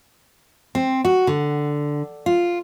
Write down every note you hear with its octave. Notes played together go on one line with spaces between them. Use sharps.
C4
F#4
D3
F4